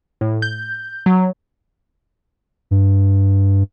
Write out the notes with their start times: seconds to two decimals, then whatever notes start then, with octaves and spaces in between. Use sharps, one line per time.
0.21 A2
0.42 G6
1.06 F#3
2.71 G2